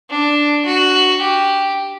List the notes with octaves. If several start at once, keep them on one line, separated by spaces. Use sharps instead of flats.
D4
F#4
G4